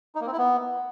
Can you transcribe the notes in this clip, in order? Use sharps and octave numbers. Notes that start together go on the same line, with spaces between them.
D#4
A#3
C4
E4
B3